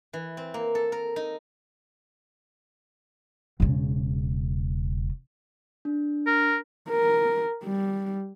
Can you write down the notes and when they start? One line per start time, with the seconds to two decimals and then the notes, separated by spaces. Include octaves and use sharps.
0.13 E3
0.37 C4
0.54 A#3
0.75 A4
0.92 A#4
1.16 D#4
3.60 E1 C#3
5.85 D4
6.27 A#4
6.89 A#4
7.64 G3